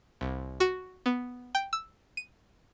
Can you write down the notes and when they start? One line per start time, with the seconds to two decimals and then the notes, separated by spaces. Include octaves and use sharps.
0.21 C2
0.60 F#4
1.06 B3
1.55 G5
1.73 E6
2.17 D#7